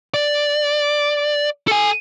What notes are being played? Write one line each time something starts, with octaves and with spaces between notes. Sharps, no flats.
D5
A4 G#5